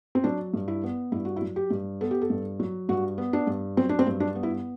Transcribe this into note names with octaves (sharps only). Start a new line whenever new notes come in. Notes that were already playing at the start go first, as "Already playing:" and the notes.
C4
F#3 D4
G2
E4
B3
G2 E4
F#4
E4
F#3
G4
G2
B3 A4
G4
A4
G2
F#3
G2 F#4
B3
D4
G2
F#3 C4
D4
C4
G2
D4
B3
E4